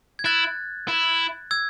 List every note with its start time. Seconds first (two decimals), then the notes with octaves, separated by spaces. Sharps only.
0.19 G#6
0.25 E4 F#6 A6
0.88 E4
1.51 E6 G#6